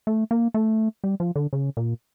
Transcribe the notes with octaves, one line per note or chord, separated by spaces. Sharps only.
A3
A#3
A3
G3
F3
D3
C#3
A#2